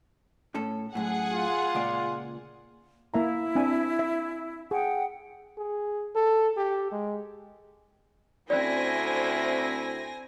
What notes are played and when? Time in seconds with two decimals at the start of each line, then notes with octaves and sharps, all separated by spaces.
0.55 A2 C#4 A4
0.95 F#2 A2 G#4 F#5
1.33 F4
1.75 C#2 A#2 D5
3.14 A#3 E4 E5 A#5
3.55 C4 D4 G#5
3.99 E5
4.71 G#4 F#5 G5
5.58 G#4
6.15 A4
6.57 G4
6.92 G#3
8.50 D2 C4 C#4 E4 D5 G#5 A#6